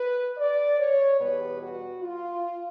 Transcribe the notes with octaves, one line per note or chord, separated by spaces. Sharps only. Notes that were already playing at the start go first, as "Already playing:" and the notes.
Already playing: B4
D5
C#5
E2 B2 G3 B3 B4
F#4
F4